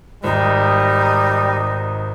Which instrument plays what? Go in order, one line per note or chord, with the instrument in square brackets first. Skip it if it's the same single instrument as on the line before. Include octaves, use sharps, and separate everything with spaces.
[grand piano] G#1 [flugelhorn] G3 [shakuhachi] D#4